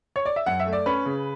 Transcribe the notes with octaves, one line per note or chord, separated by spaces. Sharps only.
C#5
D5
E5
F#2 F#5
E5
A3
D5
C#4 B4
C#3